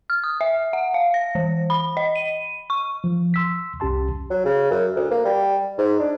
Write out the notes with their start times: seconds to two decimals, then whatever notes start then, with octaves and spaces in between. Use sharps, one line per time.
0.10 F6
0.24 D#6
0.41 E5
0.73 F#5
0.94 F5
1.14 A#6
1.35 E3
1.70 B5
1.97 D#5
2.16 D#7
2.70 C#6
3.04 F3
3.34 C6 E6 B6
3.80 C2 C#4 G4 A5 C6
4.30 F#3
4.45 C#3
4.71 F#2
4.96 D2
5.11 A#3
5.25 G3
5.78 G#2
5.99 D4